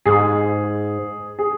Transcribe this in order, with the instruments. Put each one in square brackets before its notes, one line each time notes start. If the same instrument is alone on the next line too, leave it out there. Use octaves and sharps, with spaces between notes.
[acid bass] G#2 [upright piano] G#4
[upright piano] G#4